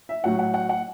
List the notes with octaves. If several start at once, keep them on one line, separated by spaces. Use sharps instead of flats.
E5
A2 F#3 F#5
F#5
F#5
F#5